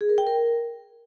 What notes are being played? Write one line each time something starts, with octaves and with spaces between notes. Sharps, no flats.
G#4
A#4
G5
A#4